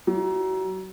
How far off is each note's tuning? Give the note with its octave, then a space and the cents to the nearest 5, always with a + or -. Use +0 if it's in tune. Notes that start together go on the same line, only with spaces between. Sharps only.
F#3 +30 E4 -10